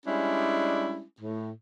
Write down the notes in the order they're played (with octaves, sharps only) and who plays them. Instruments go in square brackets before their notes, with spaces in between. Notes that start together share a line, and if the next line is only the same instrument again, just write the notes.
[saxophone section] G3 G#3 C#4 D4 E4
A2